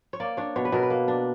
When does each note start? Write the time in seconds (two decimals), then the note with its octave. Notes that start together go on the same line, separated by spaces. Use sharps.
0.13 C#5
0.20 A#3 D5
0.37 D4 C#5
0.56 B2 C#5
0.65 B4
0.72 B2 A#4
0.83 B4
0.90 A#3
1.08 D4